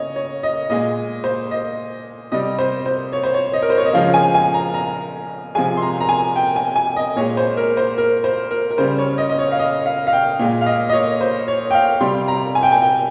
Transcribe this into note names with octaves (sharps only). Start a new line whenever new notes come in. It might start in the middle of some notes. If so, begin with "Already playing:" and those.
Already playing: C#3 C#5 D#5
C#5
D#5
A#2 G#3 D#5
C5
D#5
C3 G3 D#5
C5
C5
C#5
C5
C#5
D#5
A#4
C5
C#5
D#5
C#3 F3 G#3 F5
G#5
G#5
A#5
A#5
C3 F3 G#3 G#5
C6
A#5
A#5
G#5
G5
G#5
G#5
D#5
A#2 G#3 C#5
C5
A#4
C5
A#4
C5
A#4
A#4
C#3 G3 C5
C#5
D#5
D#5
C#5
F5
D#5
F5
F5
G5
A#2 G#3
F5
D#5
D#5
C#5
C5
C#5
G5
F5
C3 G3 C6
A#5
G#5
G5
G#5
G5